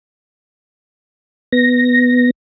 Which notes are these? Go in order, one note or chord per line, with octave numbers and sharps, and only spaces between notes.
B3 A#6